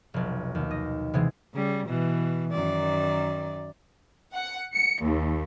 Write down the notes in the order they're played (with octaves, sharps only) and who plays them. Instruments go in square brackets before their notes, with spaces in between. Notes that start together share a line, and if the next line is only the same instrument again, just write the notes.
[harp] F1 B1
D#2
D#5
C3 E3 G#3 B3 C4
[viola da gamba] C#3 G3
B2 E3
F#2 D#3 D5
[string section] F#5
C#7
D#2